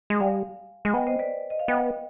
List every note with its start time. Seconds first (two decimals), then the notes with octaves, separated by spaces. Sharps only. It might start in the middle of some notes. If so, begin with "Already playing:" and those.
0.10 G#3
0.20 G3 F5 G#5
0.85 G#3
0.90 G#5
0.94 B3 D#5 G5
1.07 C5 D#5
1.19 B4 D5
1.50 D#5
1.59 F5
1.68 B3 D#5 G5